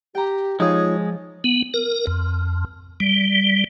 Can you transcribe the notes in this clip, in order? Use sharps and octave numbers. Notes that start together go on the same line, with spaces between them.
G4 G5 A#5
F3 G#3 D#4 F4 G#4 C#5 D#6
B3
A#4
F2
G3